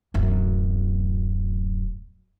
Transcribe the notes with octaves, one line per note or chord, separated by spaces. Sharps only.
D1 F#2